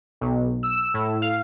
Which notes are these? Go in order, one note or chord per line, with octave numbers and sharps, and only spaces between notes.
B1
E6
A2
F5